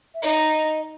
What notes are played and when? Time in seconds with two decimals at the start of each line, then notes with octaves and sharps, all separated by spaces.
0.15 E5
0.22 D#4 D#5